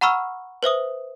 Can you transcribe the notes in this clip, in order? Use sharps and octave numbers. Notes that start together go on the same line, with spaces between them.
F#5 A#5 B5 C#6 E6 F6
B4 C5 E5 D#6